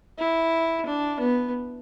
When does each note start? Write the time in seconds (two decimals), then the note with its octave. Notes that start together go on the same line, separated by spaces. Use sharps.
0.18 E4
0.86 D4
1.20 B3